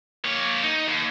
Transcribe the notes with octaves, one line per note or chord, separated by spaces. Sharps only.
A#3 C#5
D#4
D#2